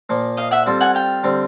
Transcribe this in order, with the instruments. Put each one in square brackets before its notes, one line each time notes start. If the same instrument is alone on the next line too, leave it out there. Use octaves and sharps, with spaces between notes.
[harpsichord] A#2 F3 A#3
[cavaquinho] D#5 F5
E5 F#5
[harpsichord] G3 C4 F4 A4 C5
[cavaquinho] F#5 G#5
F5 G5
[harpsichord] D3 G3 C4